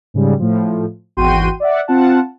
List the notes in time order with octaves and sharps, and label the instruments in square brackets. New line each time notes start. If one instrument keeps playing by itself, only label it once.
[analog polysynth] G#2 C#3 G3
A2 F3
G#1 E2 F#4 G5 C6 D#7
D5 E5 F#5
C4 F4 F#5 A5